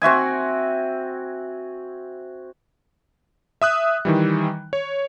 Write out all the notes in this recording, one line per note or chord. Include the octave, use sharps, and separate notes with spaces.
C4 F#4 E5 G#5
E5 D#6 F#6
D#3 E3 G3
C#5